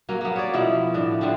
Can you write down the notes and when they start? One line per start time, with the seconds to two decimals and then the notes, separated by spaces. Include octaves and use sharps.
0.09 F#3 A#3 C#4
0.21 A#3 B3
0.36 C#5 D5
0.54 B2 F3 E4
0.94 A2 D4
1.21 D3 F3 A3 C4